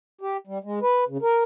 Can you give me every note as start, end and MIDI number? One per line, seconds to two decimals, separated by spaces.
0.21 0.37 67
0.47 0.58 55
0.64 0.79 56
0.82 1.04 71
1.08 1.18 49
1.22 1.43 70